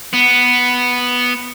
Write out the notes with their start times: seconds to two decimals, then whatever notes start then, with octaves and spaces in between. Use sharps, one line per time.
0.14 B3